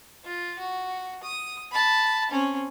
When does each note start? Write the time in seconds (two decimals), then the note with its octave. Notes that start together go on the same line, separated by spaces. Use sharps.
0.24 F4
0.59 F#4
1.23 D#6
1.72 A5 B5
2.31 C4 C#4